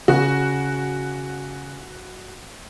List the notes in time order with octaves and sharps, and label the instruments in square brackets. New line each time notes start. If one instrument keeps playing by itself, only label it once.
[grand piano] C#3 [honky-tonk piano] F#4